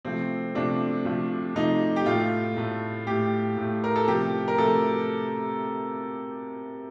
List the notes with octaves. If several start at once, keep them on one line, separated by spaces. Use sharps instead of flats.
C3 F3 A3 C4
C3 F3 A3 D4
C3 F3 A3
C3 F3 A3 D#4
G4
A2 A3 F4
A2 A3
A2 A3 G4
A2 A3
A#4
A4
C3 F3 A3 G4
A#4
C3 F3 A3 A4